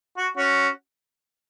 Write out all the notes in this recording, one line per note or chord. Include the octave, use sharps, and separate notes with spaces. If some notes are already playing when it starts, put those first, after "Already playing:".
F#4
C#4 F#4